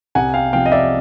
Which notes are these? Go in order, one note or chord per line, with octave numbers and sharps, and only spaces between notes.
C2 F#5 G#5
F5 G5
C3 F3 F5 G5
D#5
D5 E5